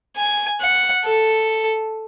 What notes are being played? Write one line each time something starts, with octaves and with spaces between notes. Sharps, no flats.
G#5
F#5
A4